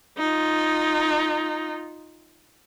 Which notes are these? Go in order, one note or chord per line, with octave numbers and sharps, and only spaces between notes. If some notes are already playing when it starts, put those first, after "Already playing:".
D#4 F4